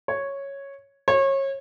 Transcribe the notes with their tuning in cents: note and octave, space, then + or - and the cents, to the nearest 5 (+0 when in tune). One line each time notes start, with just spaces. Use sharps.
C#5 -5
C#5 -30